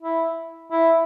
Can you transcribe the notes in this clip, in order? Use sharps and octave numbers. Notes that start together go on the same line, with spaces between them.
E4
E4